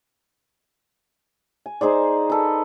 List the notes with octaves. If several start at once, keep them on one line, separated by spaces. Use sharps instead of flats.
G#5
D#4 G#4 C5 D5
A4 B4